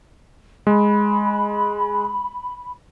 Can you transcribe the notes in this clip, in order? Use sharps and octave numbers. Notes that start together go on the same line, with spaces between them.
G#3 B5